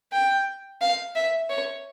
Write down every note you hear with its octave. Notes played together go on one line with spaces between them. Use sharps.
G5
F5
E5
C#5